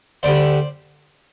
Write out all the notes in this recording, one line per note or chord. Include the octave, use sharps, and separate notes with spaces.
D2 D3 G3 C5 D5